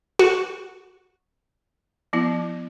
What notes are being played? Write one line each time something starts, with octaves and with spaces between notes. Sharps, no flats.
F#4
F3 B3 E4